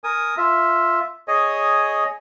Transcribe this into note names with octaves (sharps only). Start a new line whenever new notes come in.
A#4 G#5 D#6
F4 E5
G#4 C#5 D#5 G#5